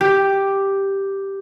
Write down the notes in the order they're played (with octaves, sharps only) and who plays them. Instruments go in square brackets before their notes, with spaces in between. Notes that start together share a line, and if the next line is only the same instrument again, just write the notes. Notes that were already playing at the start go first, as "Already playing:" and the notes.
[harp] G4